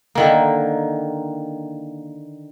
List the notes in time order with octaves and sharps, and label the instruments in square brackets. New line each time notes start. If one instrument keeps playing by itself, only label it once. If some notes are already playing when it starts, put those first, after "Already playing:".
[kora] D3 D#3 A#3